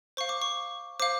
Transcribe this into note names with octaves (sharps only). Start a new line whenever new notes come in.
C5 F5 C#6
D6
C#6
C5 F5 D6